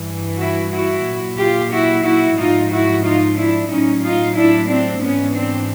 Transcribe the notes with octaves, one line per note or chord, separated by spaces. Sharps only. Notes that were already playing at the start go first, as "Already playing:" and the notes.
Already playing: G2 E3
E4 F#4
E4 F#4
A#2 F#3
F4 G4
E4 F#4
E4 F#4
G#2 F3 D#4 F4
E4 F#4
D#4 F4
D4 E4
A2 F#3 C#4 D#4
D#4 F4
D4 E4
C4 D4
G#2 E3 B3 C#4
C4 D4